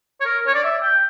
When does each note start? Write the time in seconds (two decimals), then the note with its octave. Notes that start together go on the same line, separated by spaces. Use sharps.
0.20 C#5
0.25 A#4
0.47 C#5
0.54 D5
0.64 E5
0.83 G5